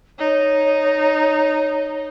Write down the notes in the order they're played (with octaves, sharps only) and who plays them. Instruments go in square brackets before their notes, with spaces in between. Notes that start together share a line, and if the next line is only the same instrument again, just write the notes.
[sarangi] D#4 [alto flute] C#5